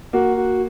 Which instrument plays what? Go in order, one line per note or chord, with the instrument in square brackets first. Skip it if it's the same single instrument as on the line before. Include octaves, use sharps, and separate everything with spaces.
[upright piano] A#3 [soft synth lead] F#4
[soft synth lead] F#4